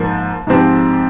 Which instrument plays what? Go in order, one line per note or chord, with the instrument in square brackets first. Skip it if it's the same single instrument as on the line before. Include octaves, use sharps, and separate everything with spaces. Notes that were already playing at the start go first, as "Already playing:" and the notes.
Already playing: [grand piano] G#2 F3 A#3
G#2 F3 C4 G4